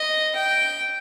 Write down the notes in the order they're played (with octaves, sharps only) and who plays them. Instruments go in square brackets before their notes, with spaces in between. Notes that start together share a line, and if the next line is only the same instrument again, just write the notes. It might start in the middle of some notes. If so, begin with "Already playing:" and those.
Already playing: [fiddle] D#5
G5